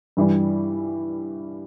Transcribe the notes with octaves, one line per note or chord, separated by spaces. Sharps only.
G2 E3 G3